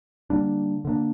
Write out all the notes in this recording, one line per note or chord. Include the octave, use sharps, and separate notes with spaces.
D3 G3 A#3 D4
D3 G3 A#3 D4